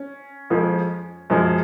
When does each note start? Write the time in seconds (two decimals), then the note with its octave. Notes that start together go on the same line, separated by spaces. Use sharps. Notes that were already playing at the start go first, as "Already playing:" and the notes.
Already playing: C#4
0.50 F2 F3 G#3
1.30 F#2 F3 G#3